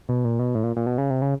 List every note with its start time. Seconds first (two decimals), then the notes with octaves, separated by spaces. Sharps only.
0.09 B2
0.24 A#2
0.40 B2
0.55 A2
0.64 A#2
0.76 A#2
0.86 B2
0.98 C#3
1.10 C3
1.22 C#3